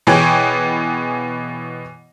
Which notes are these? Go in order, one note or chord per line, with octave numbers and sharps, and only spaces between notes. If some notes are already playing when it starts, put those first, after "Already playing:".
B2 E3 B3 G#4 C#5 G5